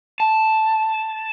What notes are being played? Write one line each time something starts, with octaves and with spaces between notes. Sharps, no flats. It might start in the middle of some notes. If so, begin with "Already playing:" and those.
A5